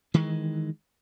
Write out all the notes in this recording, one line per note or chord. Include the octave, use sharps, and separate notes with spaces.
D#3 E3 G#3